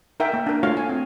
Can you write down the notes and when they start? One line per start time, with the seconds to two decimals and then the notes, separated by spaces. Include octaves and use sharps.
0.20 D#4 A#4 E5 F#5 G5
0.34 A#3
0.47 D4 A#4
0.63 A3 F4 F#4 C#5 F5
0.77 G#5
0.89 C4